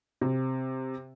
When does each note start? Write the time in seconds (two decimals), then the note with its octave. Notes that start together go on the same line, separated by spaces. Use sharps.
0.21 C3